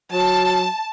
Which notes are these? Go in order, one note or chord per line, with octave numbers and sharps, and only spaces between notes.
F#3 A5